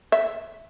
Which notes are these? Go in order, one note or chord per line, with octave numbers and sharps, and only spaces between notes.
E5